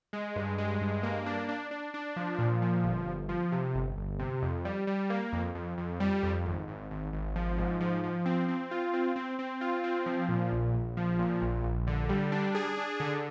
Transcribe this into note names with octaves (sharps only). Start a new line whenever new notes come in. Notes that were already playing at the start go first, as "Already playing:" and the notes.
G#3
G2
G#3
G2
A#3
D4
D4
D4
D4
F3
A#2
F3
G1
G1
F3
C3
G1
G1
C3
F2
G3
G3
A#3
F2
F2
F2
G3
F2
G#1
G#1
G#1
G#1
F3
G#2
F3
F3
C4
C4
F4
C4
C4
C4
F4
C4
F3
A#2
A#1
A#1
F3
A#2
A#1
A#1
D3
G3
D4
G#4
D4
D3